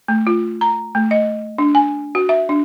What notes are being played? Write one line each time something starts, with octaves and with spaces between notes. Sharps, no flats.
A3
F4
A#5
A3
D#5
D4
G#5
F#4
E5
D4